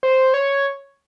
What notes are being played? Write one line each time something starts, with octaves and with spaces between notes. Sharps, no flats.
C5
C#5